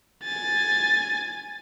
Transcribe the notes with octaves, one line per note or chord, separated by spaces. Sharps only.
G#5 A6